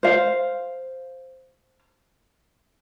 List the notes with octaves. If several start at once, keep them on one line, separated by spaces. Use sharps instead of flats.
C5 F5